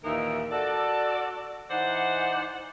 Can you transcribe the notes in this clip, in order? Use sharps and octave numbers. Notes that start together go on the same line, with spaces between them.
D#2 A#2 E3 D#4 A#4 E5
F#4 A4 D5
E3 D#4 C5 D5 F#5